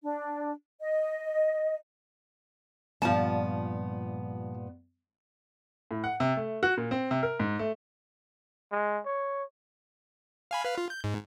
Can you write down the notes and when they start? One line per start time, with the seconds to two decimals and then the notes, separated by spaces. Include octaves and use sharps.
0.03 D4
0.81 D#5
3.02 G2 A#2 F3 B3 A5
5.91 A2
6.04 F#5
6.20 C3
6.37 A3
6.63 F#4
6.77 A#2
6.91 C4
7.11 C3
7.23 A#4
7.39 G#2
7.59 A3
8.72 G#3
9.06 C#5
10.51 F5 G#5 B5
10.65 B4 F5
10.78 F4
10.90 G6
11.04 G#2